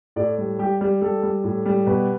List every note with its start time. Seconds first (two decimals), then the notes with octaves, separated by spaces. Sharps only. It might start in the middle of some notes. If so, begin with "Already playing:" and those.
0.16 A2 D5
0.38 G3
0.59 G3 G4
0.81 G3
1.02 G3 A4
1.23 G3
1.44 A2
1.66 G3
1.87 B2 B4